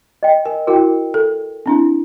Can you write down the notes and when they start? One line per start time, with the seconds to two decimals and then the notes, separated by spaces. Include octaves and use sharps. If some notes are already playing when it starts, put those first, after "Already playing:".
0.23 D#5 G5
0.45 A#4 G#5
0.67 E4 F#4 A#4 G5
1.14 A4
1.66 C4 D4 E4